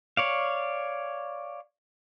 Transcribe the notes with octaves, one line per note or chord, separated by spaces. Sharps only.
C#5 D5 F5